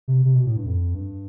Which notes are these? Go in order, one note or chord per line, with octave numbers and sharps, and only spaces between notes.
C3
C3
B2
A2
G2
F2
G2